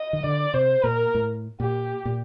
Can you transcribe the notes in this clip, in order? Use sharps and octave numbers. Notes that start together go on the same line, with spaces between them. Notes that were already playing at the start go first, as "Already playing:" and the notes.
Already playing: D#5
D#3
D3 D5
C3 C5
A#2 A#4
A2
A#2 G4
A#2